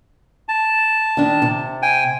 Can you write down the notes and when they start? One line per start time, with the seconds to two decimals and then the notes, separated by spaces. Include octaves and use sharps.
0.49 A5
1.17 D#3 D4
1.42 C3
1.82 G5 G#5